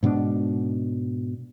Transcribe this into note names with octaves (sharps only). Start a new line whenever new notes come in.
G#2 B2 C4 D4